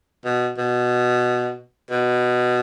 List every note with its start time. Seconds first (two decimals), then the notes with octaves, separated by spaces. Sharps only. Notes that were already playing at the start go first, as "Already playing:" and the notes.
0.25 B2
0.58 B2
1.91 B2